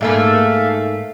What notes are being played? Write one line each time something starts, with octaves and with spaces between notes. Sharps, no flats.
G#2 A3 A#3 A4 E5 F5